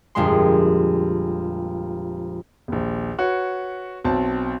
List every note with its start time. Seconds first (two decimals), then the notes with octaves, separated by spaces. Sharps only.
0.15 G1 F2 A#2 G#3 C6
2.68 A#1 D#2
3.19 F#4 B4 C#5
4.04 B1 C4 A5